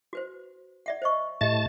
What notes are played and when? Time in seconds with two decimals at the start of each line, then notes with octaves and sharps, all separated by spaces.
0.13 F#4 B4 C5
0.86 D5 E5 F#5
1.02 C5 D#5 C#6
1.41 A2 G4 D#5 E5 A5 A6